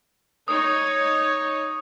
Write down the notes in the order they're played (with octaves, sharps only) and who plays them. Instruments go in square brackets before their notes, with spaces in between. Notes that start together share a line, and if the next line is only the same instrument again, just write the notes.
[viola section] D#4 C#5 [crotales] D#6